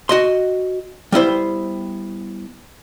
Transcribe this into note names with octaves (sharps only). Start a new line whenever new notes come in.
F#4 D#5 C6
G3 B3 E4 C5